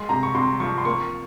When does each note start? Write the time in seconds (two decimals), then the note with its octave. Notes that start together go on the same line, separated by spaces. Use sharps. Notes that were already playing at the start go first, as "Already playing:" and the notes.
Already playing: G#3 C6
0.09 C3 A#5
0.23 C#6
0.35 C3 C6
0.60 F3 C#6
0.78 C6
0.85 A#3 C#6